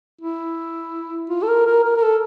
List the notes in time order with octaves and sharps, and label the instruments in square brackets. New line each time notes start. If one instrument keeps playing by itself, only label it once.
[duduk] E4
F4
A4
A#4
A#4
A#4
A#4
A4